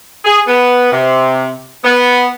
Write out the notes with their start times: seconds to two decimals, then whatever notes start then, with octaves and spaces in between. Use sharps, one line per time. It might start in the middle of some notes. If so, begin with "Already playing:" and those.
0.25 G#4
0.47 B3
0.91 C3
1.83 B3